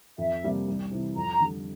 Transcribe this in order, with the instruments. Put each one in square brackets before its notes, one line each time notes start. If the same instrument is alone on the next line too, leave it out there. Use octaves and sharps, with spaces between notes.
[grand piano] F2 [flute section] E5
[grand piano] C3 G3 A#3
C2
C3 E3
[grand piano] F2 [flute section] A#5
[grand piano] D3 G3